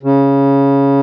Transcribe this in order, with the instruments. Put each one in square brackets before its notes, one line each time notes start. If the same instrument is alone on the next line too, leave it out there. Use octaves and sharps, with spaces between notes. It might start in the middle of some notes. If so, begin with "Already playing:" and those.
[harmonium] C#3